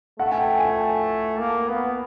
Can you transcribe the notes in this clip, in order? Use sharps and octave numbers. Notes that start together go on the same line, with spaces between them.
A3 F#5
G#5
G5
G#5
A#3
B3